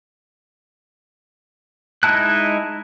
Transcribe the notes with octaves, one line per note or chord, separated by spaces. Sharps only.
G#3 D#4 E4 A5 F#6